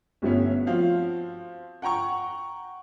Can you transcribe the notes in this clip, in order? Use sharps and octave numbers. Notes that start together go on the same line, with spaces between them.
G1 G3 A3 B3 C#4
F3 C4 F#4 F5
F#5 G5 A#5 C#6